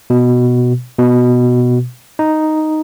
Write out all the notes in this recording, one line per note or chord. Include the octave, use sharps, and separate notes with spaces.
B2
B2
D#4